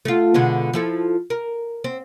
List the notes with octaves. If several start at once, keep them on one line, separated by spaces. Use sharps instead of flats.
A3 F4
B2 D3 G#3
F3 E4 A4
A#4
C4